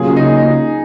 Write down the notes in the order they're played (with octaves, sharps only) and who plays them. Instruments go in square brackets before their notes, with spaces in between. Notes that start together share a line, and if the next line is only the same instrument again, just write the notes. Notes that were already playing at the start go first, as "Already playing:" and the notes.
Already playing: [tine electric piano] C#3 F#3 A#3 C#4 F4 [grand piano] G#4
[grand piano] D#4